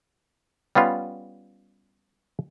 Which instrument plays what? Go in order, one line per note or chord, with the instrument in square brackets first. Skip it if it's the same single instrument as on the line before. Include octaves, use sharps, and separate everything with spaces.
[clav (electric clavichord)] G3 B3 C#4 F4